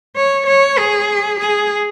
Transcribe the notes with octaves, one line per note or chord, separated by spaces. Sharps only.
C#5
C#5
G#4
G#4